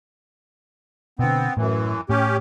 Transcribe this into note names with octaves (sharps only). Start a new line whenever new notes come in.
B2 D3 B3 C4
F#2 A2 E3
A2 C#4 G4